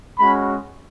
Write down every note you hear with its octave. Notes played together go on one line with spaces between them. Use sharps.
G#3 C#4 F#4 B5